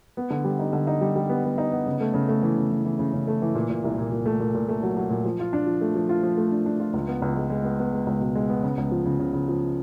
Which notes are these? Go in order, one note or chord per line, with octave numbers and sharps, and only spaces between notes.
B3
D3
G3
D#4
D3
D#4
G3
G3
B3
B3
D#4
B3
C#3
A3
C#3
A3
E3
C#3
E3
E3
C#3
C#3
A3
E3
A#2
A#2
C2
A#2
A#2
A3
A#2
A#2
A3
F#3
F#3
A#2
F3
F4
D4
F3
A3
F3
F4
F3
A3
D4
D4
F4
C#2
B3
C#2
G#3
G#3
B3
B3
G#3
C#2
B2
G#3
B3
C#3
C#2
F3
C#3
C#3
C#3
F3